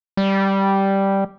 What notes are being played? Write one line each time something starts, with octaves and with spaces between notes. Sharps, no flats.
G3